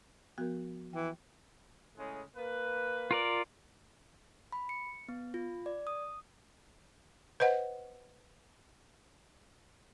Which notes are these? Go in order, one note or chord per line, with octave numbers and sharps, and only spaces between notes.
F3 B3 F#4 A#4
E3 G5
A2 C#3 G#3
A#3 B4
F4 A#4 D5
B5
C#7
B3
F4
D5
D#6
B4 C5 D#5 F#5